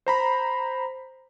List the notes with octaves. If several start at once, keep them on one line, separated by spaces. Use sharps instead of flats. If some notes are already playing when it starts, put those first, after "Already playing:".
C5 A#5 B5